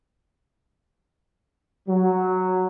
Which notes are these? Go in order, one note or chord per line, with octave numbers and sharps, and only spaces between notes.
F#3